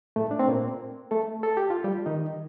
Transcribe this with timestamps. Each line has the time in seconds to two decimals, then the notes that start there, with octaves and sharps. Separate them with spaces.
0.16 A2 A3
0.31 D4
0.39 C4
0.48 A#2 A#3
1.11 A3 A4
1.43 A4
1.57 G4
1.70 F4
1.84 G3 G4
2.06 D#3 D#4